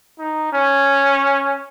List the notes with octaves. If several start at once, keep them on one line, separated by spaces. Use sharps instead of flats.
D#4
C#4